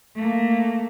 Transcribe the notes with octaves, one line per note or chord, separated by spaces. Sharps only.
A3 A#3